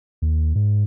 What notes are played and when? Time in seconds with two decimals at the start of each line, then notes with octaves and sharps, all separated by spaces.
0.22 D#2
0.55 G#2